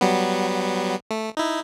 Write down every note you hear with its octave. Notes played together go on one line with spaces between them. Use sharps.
F#3 G3 B3
A3
D#4 E4